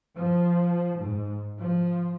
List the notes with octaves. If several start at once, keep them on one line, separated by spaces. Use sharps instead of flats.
F3
G#2
F3